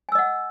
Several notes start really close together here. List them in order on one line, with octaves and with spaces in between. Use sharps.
G#5 E6 D#5 F#5